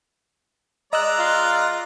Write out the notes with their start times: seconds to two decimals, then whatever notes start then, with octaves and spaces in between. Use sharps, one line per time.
0.93 G#3 D5 D#5 A#5 E6 F#6
1.19 F4